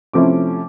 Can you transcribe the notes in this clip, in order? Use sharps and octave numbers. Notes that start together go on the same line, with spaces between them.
C3 F3 A3 C#4 E4 D6